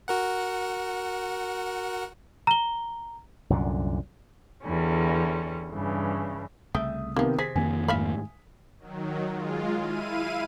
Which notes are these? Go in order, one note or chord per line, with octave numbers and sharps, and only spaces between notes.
F#4 A#4 F#5
A#5 G7
C2 F#2 A#2 D3
E2 D3 G3 C#4
G2 C#3 E3
C2 C#3 A3 E5 G5 D#6
C3 D#3 F3 A#3 B3
C3 G#4 C5 B6
F2 D#3 A#3 G#5
G#2 A3 E5 F5 B5
D#3 F#3
G#3 F4
E4 F5 D#7